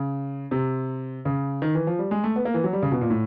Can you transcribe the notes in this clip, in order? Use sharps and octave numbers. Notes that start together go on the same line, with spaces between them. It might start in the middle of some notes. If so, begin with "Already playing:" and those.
Already playing: C#3
C3
C#3
D#3
E3
F3
G3
G#3
A3
B3
A#3
E3
F#3
G3
C#3
B2
A#2
A2